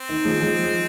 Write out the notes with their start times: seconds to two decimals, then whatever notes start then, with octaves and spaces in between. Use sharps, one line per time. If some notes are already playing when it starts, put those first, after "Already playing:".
Already playing: C4
0.09 D#3
0.25 F3 G#3
0.41 F3 G#3